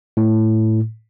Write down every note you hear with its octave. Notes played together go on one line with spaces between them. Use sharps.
A2